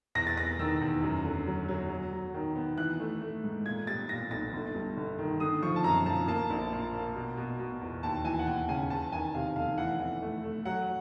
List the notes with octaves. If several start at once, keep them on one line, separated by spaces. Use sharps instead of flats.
E2 A#6
A6
E2 A#6
D#3 E6
E2
F#2
D3
F#3
F#3
F#3
F#3
D#3
B3
E3 F#6
A3
A3
G#2
A#2 G#6
G3 A6
A#2 A#6
B1 A6
G1
G2
G1
D#3
D3 D#6
F3 C#6
A5
F#2 A#5
F3 A5
A#3 A5
A#1
A#2
A#3
B2
B2
B2
E2
D#2 A5
E3 G#5
F#5
D#2 G5
C#3 G#5
E2 A5
D#3 G#5
C3 F5
F1 F5
E3 F#5
E3
A3
A3
F#3 F#5